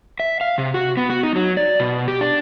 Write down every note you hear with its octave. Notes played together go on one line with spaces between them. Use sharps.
E5
F5
C3
F#4
B3
F#4
D#4
F#3
D5
B2
G4
D4